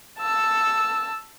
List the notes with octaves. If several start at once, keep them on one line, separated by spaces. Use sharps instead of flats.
A5 E6